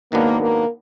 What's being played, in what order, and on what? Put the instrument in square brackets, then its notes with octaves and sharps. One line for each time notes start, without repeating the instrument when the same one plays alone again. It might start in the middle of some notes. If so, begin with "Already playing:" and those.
[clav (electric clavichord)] G#2 D#3 F#3 B3 D4 [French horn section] A#3
[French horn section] A#3